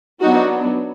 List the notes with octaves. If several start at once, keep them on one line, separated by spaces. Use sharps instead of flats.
F#3 B3 D4 D#4 F#4